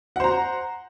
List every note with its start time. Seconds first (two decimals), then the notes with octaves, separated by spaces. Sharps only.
0.16 F#5
0.20 C5
0.24 A#5